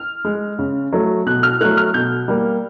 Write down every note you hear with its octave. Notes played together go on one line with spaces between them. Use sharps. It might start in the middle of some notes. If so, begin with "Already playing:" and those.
Already playing: F6
G#3
C#3
F#3 A3
B2 F#6
F6
F#3 A3 F#6
F6
B2 G6
G3 A#3